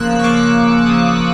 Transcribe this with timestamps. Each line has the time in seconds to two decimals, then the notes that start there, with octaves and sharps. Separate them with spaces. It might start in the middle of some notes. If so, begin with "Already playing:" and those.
Already playing: C#3 F3 A#3 E6 F#6
0.19 C#6
0.23 C#3 F3 A#3 D6
0.86 C#3 F3 A#3 D#6